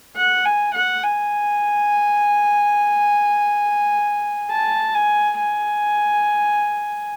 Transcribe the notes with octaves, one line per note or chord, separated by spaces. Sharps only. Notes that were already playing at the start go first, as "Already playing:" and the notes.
F#5
G#5
F#5
G#5
A5
G#5
G#5